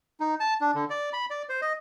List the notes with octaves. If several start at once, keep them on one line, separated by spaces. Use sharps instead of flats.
D#4
A5
D4
D3
D5
B5
D5
C5
D#5